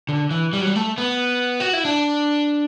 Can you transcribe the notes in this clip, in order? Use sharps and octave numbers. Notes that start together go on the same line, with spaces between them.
D3
E3
G3
F#3
G3
A3
B3
F#4
E4
D4